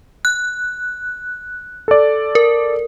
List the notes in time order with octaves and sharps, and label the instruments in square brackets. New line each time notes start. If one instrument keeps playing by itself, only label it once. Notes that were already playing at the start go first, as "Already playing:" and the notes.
[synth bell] F#6
[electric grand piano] A4 D5
[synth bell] A#4